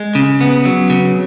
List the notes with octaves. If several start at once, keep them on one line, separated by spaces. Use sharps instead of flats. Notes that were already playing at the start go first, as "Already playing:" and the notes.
Already playing: G#3
C#3
B3
F#3
C#3